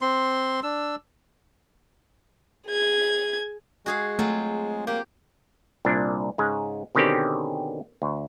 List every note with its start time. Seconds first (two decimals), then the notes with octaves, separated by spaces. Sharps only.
0.01 C4 C6
0.63 D4 E6
2.67 G#4 G#6
3.86 G#3 F#4 G#4 F5
4.19 F#3 A3 C4 F4
4.87 A#3 G4
5.85 C2 A#2 D4
6.38 G#2 C#3 G#3
6.95 B2 D3 D#3 C4 C#4 G4
8.02 D2